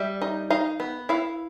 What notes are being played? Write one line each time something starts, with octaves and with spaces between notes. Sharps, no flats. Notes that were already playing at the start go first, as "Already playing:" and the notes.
Already playing: G3 E5
D#4
D#4 F5
B3
E4 F5